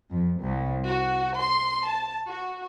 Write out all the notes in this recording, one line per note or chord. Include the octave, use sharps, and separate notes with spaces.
F2
C2
F#4
C6
A5
F#4